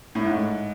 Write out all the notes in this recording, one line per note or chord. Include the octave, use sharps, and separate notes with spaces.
A2
G#2